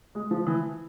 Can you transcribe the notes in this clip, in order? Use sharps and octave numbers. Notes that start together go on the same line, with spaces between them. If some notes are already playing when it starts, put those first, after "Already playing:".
G#3
F3
E3